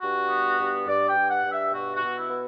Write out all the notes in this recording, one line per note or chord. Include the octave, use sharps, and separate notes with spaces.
G2 F#4
B3
G2
G2 D5
G5
G2
F#5
G2
E5
B2 F#4
F#4
B2
E4
B3